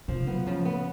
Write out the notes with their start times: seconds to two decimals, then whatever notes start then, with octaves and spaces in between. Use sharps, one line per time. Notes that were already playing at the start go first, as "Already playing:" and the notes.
0.08 B2 F3
0.27 F#3 B3
0.46 C#3 F3
0.65 B3